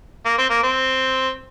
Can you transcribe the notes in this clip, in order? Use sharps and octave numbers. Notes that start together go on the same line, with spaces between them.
A#3
C4
A#3
C4